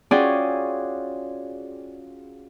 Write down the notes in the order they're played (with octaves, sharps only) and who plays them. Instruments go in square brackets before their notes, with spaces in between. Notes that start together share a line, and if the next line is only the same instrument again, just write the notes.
[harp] C#4 F4 F#4 G#4 D5 G5